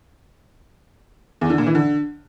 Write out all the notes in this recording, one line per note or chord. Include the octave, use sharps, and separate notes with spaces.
E2
D3
A#2
E3
D3